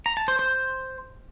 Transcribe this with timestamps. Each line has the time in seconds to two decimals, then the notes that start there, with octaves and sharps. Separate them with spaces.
0.06 A#5
0.17 A5
0.28 C5
0.39 C5